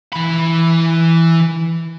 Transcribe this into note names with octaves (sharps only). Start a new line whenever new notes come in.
E3 B5